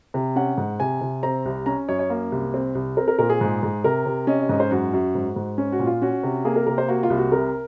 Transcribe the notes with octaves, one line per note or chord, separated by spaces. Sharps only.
C3
C#4 F#5
G#2
C3 G#5
C3
C4 A#5
C2
C#4 A#5
F#2 C#5
C#5
A#3
C2
C4
C2
C4 A#4
A#4
A#2 A#4
G#4
G#2
G#2
C3 A#4
C3
C#4 D#5
D#5
G#2 D#5
C5
F#2 F#4
F#2
G#2
G#2
C#4
F#4
A#2
F4
C#4 F#4
C3
A#3 G#4
A#4
C3 A#4
C5
A#3 F#4
F4
C2
F#4
C3 A#4